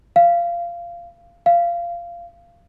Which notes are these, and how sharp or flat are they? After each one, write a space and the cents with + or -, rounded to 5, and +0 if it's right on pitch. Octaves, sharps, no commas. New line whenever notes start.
F5 -20
F5 -20